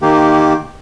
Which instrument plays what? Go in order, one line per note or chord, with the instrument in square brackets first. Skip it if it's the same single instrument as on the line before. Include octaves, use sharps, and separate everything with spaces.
[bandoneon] D#3 A#3 G4